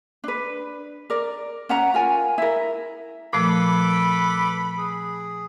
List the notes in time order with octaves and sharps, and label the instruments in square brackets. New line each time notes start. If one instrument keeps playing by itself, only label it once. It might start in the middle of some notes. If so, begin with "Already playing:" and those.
[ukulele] D4 B4
A#4 D5
C#4 F#5 A#5
F4 A#4 G#5
E4 A#4
[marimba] A#2 F3 A3 [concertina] A4 B4 D6 [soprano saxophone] B5
[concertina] G#4